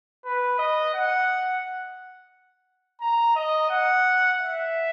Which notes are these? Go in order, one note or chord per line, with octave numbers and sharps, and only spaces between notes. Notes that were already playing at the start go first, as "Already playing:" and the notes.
B4
D#5
F#5
A#5
D#5
F#5
E5